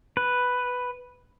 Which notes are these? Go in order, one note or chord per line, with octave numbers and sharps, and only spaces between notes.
B4